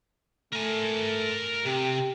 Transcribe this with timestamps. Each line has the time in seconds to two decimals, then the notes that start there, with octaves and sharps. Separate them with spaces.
0.53 A3 A#4 G#5
1.66 C3 G4